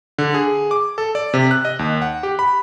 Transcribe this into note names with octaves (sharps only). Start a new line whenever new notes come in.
D3
G#4
D6
A4
D5
C3
F#6
D#5
D#2
F#5
G4
B5